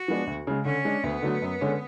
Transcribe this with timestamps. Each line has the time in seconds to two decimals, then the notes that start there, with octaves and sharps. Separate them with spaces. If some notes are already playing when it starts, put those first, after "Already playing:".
Already playing: F#4
0.08 F3 G#3 B3 D4
0.27 D2
0.47 C#3 G#3
0.65 D3 C#4
0.85 G#3 D4
1.04 D2 B3
1.22 D3 F#3 A3
1.42 F#2
1.61 D3 G#3 C#4